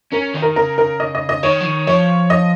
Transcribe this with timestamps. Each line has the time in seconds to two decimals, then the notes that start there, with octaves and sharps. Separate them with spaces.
0.12 C#4 A#4
0.34 D#3
0.42 A#4
0.56 C#3 A#4
0.78 A#4
1.00 D#5
1.15 D#5
1.29 D#5
1.43 D#3 C#5
1.61 F3
1.65 D#3
1.87 F3 C#5
2.30 D#5